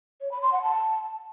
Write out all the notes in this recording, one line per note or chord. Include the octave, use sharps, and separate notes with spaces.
C#5
B5
C6
F#5
A5